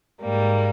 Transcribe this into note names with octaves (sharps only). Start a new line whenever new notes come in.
G#2 G3 A#3